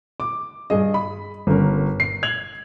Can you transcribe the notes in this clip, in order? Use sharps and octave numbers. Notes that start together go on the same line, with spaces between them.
D6
G2 G#4 D#5
B5
G1 C#4 A#4
C7
G#6 F7 F#7